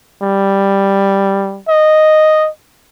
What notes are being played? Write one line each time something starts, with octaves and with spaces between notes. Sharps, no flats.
G3
D#5